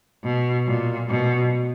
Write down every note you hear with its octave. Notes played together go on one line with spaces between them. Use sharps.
B2
A#2
B2